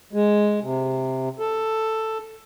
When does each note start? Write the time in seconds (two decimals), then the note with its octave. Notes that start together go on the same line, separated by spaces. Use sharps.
0.13 G#3
0.62 C3
1.39 A4